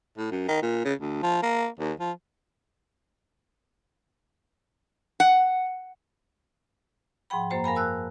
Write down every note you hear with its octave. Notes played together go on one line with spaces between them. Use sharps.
A2
F#2
D#3
A#2
C#3
D2
F3
A#3
D#2
F3
F#5
G#2 F3 F#5 G5 B5
F#2 A#3 C5 A#5
A#4 F5 G#5 B5
A5 E6 F#6